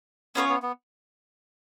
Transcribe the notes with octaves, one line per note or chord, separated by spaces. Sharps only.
B3 C#4 F4 A#4 C#5
B3
B3